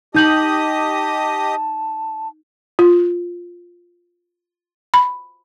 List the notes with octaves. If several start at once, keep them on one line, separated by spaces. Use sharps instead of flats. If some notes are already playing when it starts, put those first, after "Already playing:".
D#4 G4 D#5 A5 D#6 G6 F#7
F4
B5